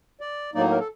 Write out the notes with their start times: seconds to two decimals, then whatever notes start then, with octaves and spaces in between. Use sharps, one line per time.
0.21 D5
0.54 A2 F#3 A#3 D#4 D5
0.72 A#4
0.80 A4